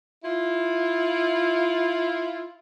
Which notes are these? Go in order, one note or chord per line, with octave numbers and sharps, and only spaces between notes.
E4 F4